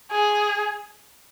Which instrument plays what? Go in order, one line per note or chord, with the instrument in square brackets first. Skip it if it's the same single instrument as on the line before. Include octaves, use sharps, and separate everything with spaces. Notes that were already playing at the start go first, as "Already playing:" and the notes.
[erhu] G#4